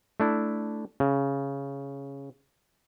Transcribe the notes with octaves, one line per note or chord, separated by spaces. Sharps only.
A3 D4 E4
C#3